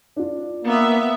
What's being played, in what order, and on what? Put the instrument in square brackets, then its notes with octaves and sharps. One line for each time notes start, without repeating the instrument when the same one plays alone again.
[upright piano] D4 F4
[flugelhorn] A#3 [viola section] B3 E5